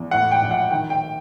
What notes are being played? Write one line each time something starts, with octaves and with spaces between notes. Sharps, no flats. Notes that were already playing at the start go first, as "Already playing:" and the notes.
Already playing: E2
A2 F#5
G5
A#1
F#5
D#3 G5
G5